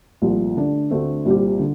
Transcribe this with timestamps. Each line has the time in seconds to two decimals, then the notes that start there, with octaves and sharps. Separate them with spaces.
0.22 C2 A#2 F3 A3
0.56 D3 A3 D4
0.90 D2 D3 A3 C4
1.25 C2 A#2 G3 C4 G4
1.59 D3